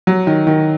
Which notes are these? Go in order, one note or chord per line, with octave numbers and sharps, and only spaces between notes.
F#3
D#3
D#3